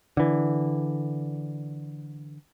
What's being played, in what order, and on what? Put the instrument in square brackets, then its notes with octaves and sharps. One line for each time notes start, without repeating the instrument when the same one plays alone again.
[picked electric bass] D3 E3